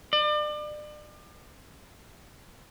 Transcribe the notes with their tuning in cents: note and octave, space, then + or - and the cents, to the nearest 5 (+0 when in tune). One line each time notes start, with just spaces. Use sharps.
D5 +35